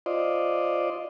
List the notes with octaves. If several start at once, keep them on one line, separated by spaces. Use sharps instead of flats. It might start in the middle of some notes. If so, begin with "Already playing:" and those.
F4 C5 D5 D#5